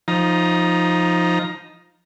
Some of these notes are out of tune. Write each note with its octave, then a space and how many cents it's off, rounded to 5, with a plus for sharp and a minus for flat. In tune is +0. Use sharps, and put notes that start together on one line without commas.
F3 +0 D#4 +0 A#5 +20